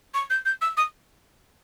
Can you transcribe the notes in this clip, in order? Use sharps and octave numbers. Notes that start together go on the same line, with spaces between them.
C#6
G6
G6
E6
D#6